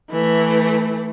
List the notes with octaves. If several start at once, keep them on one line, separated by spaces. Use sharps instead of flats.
E3 A3